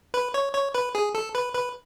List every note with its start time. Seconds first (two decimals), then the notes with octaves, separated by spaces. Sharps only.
0.14 B4
0.34 C#5
0.54 C#5
0.74 B4
0.95 G#4
1.15 A4
1.35 B4
1.54 B4